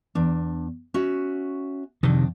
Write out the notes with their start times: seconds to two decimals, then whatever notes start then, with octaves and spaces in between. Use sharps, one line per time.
0.15 E2 D4
0.94 C#4 F#4 E5
2.03 F2 C3 D#3 D4